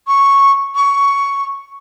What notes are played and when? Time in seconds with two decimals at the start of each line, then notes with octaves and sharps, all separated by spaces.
0.07 C#6
0.75 C#6